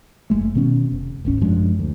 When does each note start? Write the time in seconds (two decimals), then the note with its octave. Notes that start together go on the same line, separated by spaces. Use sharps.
0.30 F#1 G#3 A3
0.55 B2 D#3 B3 C#4
0.92 F1
1.25 D1 G#1 C#4
1.41 F#2 F3 G#3 D4
1.79 D2